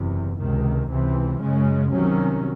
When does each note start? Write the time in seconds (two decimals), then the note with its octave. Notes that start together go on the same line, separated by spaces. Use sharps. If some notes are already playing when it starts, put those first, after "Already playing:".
Already playing: F#1 E2 C3
0.39 C#2 C3 D#3
0.90 C#2 C3 E3 C4
1.41 F#2 C#3 G#3 C#4
1.92 C2 C3 D#3 F#3 C#4